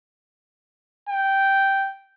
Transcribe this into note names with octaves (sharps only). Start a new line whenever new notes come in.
G5